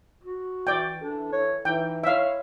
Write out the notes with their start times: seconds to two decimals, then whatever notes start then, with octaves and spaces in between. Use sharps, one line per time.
0.24 F#4
0.67 E3 D5 G5
1.01 E3 D4 A4
1.32 C#5
1.65 E3 D#4 G5
2.04 E4 C#5 E5 F5